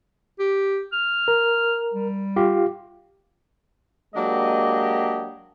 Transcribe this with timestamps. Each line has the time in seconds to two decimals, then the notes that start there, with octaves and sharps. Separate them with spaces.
0.39 G4
0.93 F6
1.28 A#4
1.94 G3
2.36 F4 G4 F5
4.15 F#3 G#3 A#3 D4 G4 D#5